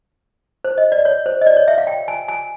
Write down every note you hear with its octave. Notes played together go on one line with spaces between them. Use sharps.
C5
D#5
D5
C#5
C5
D#5
D5
C#5
E5
F5
G5
G#5
G#5